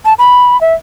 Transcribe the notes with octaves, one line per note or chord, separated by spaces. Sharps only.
A5
B5
E5